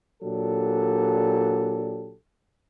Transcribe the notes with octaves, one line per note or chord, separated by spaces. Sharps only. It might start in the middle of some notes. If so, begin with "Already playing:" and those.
A#2 F#3 D4 G4 A4